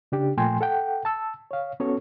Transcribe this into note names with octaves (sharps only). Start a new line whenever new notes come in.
C#3 D4 G4
A#2 F3 A3 G5 G#5 C6
A4 F#5 G5
A5 E6
C#5 F5
B3 C#4 F#4 A4 C#5